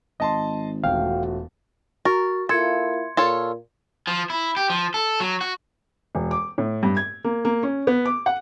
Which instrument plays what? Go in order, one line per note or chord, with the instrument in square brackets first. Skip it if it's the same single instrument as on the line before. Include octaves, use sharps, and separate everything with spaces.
[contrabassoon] G#1 [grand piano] D#5 A5 C6
[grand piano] E1 [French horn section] A3 F4 F#4 [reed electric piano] F5 G5
[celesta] F#4 C#6 A6 [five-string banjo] A#4
[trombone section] A#3 E4 F4 [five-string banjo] A4 [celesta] C6 G#6 C#7
[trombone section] A#2 [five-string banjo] F4 A4 C#5
[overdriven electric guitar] F3
E4
G4
F3
A4
F#3
F#4
[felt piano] E1
D6
A2
G2
G#6
A#3
A#3
C#4
B3
D6
F#5